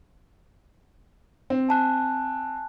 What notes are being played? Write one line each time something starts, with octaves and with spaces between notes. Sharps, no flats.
C4
G#5 A5 F#6